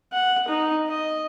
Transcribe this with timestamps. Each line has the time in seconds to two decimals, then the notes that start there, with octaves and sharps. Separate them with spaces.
0.13 F#5
0.48 D#4
0.88 D#5